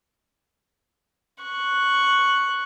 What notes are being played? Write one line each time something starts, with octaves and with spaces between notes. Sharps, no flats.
C#6 F#6